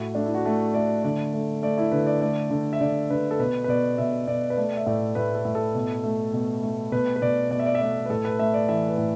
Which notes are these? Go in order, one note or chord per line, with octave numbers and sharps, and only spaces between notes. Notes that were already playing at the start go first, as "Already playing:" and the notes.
Already playing: A2 F#4
A3 D4
E4
F#4
A3 A4
A3 D5
D3 D5
A3
A3 D5
E4
D3 B4
D5
A3 D5
D3
E5
D3 D5
D3 B4
A4
B2 B4
B4
B2 D5
B2 E5
B2 D5
B4
A3 D5
E5
A2 D5
A2 B4
A4
A2
A4
B2
A3
B2
A3
B2 B4
B4
B2 D5
B2 D5
E5
D5
E5
A3 D5
B4
A2 A4
B4
A3 E5
D5
E3 E5
B4
A2